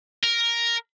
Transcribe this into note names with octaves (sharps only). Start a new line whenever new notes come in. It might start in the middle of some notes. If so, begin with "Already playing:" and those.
A#4